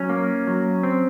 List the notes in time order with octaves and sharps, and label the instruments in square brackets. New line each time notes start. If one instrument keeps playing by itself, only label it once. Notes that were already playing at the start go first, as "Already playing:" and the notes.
Already playing: [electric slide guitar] F#3 C#4
A#3
F#3
C4